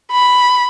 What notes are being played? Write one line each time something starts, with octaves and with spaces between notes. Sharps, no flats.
B5